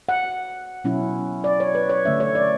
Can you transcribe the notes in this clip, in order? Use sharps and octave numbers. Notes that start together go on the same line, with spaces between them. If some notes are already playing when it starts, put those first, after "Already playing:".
F#5
B2 F#3 C#4 E4
D5
C#5
B4
C#5
D3 A3 C#4 E5
C#5
D5